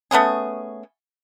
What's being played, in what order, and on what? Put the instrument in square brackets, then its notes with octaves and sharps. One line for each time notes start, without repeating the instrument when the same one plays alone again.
[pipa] A3 B3 C#4 G#4